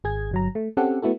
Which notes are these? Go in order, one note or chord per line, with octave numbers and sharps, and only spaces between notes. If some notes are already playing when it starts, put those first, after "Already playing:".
G#1 G#4 G#6
G1 F#3 A#5
A3
C4 C#4 G4 A4 F#5
A3 B3 E4 F#4 A4